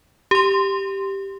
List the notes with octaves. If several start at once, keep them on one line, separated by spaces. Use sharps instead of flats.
G4 C6